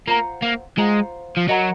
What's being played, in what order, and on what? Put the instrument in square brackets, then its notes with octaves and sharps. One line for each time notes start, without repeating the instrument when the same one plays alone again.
[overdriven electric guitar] A#3 [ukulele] F4 C5 F#5 A#5
[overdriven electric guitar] A#3
[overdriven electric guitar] G#3 [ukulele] F4 C5 F#5 A#5
[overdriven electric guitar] F3
[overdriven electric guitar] F#3 [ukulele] A#4 D#5 F#5 A#5